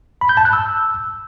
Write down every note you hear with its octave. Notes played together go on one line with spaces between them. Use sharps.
B5
G6
A5
F#6
E6